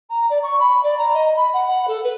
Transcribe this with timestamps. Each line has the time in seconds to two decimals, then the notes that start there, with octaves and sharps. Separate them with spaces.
0.10 A#5
0.30 D5
0.43 C#6
0.60 B5
0.83 D5
0.98 A#5
1.14 D#5
1.36 B5
1.54 F#5
1.88 A4
2.04 B4